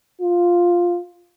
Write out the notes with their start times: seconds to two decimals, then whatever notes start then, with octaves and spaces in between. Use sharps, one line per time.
0.21 F4